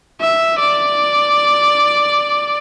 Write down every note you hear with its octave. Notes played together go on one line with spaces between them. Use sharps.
E5
D5